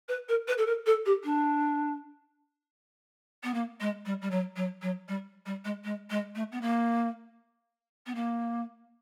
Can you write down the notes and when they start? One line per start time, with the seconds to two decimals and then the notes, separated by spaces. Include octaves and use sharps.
0.08 B4
0.28 A#4
0.47 B4
0.58 A4
0.66 A#4
0.86 A4
1.05 G4
1.24 D4
3.43 B3
3.54 A#3
3.80 G#3
4.05 G3
4.22 G3
4.31 F#3
4.56 F#3
4.82 F#3
5.08 G3
5.46 G3
5.64 G#3
5.84 G#3
6.10 G#3
6.35 A3
6.52 B3
6.61 A#3
8.06 B3
8.15 A#3